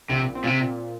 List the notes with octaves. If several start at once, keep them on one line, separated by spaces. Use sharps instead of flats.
A#1 C3
C4
A#2
C3
A#2